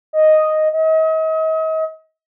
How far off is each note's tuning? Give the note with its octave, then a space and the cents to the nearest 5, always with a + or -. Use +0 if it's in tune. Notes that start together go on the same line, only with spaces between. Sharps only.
D#5 +0
D#5 +40